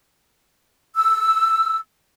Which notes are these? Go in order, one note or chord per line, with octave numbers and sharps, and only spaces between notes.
E6